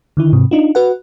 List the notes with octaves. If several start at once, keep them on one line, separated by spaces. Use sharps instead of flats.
D3 D#3 E4
G#2 C3
D4 D#4 F4
F#4 B4 F#5